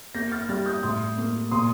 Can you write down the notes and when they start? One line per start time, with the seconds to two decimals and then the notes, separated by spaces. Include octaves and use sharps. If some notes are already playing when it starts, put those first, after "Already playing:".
0.15 A#3 G6 A#6
0.32 F6 A6
0.49 G3 F6 A6
0.66 D#6 G6
0.83 A2 C6 D#6
1.18 A#3
1.51 A#2 C6 D#6